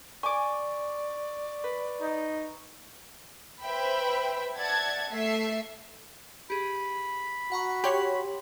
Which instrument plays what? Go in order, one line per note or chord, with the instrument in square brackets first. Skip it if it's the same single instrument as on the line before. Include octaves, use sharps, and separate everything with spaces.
[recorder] D5 [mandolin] G#5 D6 [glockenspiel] C#6
[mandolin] B4
[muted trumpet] D#4
[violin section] B4 C5 E5 G5 B5
D5 E5 F#5 A5 G#6 A6
A3 E5 C7
[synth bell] G4 G#4 [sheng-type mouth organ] B5
[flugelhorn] F#4 [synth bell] F#5 A#5 C#6
[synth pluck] G4 C#5 [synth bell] C6 B6 F#7